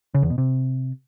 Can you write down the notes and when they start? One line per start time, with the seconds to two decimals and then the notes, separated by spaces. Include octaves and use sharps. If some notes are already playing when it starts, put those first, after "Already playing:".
0.15 C#3
0.22 E2
0.30 B2
0.38 C3